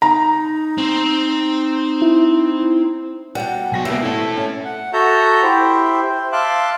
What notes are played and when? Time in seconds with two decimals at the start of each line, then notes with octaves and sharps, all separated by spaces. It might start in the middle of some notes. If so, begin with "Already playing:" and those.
0.02 D#4 A#5
0.78 C4 C5
2.02 E4
3.35 B2 G3 F#5
3.72 B1 F#4 G#5 A#6
3.85 C2 B2 A#3 B3 E5
4.03 A3 C4 E4 A4
4.37 C#4
4.65 F#5
4.93 F#4 A4 E5 A5 A#5 G6
5.43 E4 G4 C5 E5
6.09 C5
6.32 E5 F5 A5 C6 D6 F#6